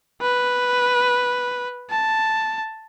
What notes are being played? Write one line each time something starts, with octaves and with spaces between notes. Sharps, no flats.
B4
A5